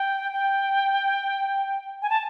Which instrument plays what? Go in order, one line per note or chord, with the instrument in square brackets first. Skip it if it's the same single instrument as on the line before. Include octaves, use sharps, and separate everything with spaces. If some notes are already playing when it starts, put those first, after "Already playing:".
Already playing: [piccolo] G5
G5
G#5
A5